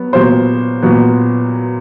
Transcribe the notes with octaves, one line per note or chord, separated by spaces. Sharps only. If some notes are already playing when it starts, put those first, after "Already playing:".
Already playing: F#3 B3
A#2 F#3 B3 C5
A#2 F#3 B3